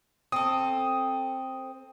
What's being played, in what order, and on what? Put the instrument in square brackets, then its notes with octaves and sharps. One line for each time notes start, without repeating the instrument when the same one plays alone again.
[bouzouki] C4 A4 [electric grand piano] D#6